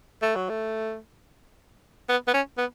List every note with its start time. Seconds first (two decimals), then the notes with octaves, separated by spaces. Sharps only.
0.22 A3
0.35 F#3
0.49 A3
2.09 B3
2.27 B3
2.34 C#4
2.57 B3